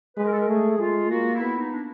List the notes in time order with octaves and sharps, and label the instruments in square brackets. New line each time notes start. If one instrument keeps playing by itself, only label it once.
[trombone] G#3 [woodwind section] B4
[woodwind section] A#4
A4
A#4
[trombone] A3 [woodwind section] G#4
[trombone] G#3 [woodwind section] F4
[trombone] A#3 [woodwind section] F#4
[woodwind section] F4
E4
[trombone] B3
[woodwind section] D#4
D4